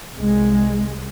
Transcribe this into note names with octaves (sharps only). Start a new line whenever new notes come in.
C2 G#3